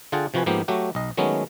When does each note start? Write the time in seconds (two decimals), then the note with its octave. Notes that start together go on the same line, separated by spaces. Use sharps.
0.12 D3 F4 G#4 F#5 G5 A5
0.34 C3 F3 F#4 B4 G#5
0.46 G#2 F3 A#3 B3 G4
0.68 F#3 A3 F#4 G4
0.95 B1 D#5
1.17 D#3 F#3 G#3 A3 B3 C#4